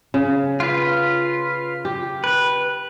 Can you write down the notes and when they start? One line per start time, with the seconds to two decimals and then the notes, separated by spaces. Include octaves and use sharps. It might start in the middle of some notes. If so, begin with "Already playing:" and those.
0.14 C#3
0.60 F4 B4
1.85 G4
2.24 B4